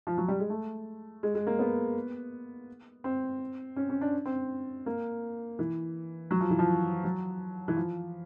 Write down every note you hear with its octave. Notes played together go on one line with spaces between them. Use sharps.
F3
F#3
G3
G#3
A3
G#3
G#3
A#3
B3
C4
C#4
C#4
D4
C4
A#3
E3
F#3
F3
E3
F3
F#3
E3
F3